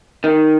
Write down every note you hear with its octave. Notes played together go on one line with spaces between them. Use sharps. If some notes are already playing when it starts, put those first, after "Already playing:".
D#3